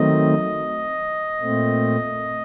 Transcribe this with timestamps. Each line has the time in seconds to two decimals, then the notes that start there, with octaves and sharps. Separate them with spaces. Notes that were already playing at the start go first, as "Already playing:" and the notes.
Already playing: D#3 F#3 A3 C4 D#5
1.40 A#2 A3 C4